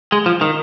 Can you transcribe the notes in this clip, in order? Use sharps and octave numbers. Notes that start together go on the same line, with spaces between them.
G#3
F3
D#3